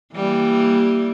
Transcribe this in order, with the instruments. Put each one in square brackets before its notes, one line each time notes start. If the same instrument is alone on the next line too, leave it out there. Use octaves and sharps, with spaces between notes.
[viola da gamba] E3 G3 A#3